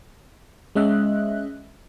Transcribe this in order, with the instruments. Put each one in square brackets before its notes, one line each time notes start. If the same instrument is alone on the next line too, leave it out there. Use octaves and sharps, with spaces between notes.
[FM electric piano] G#3 C#4 D#5 E5 F#6